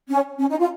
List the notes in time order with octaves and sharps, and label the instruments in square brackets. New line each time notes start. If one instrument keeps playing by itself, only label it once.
[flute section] C#4
C#4
D#4
F4